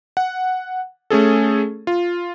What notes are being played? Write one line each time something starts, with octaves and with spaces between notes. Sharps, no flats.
F#5
A3 C#4 G#4 A4
F4